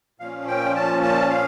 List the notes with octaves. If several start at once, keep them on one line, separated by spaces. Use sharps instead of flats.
A#2 F3 C#4 F5
G5
A5
A5
F5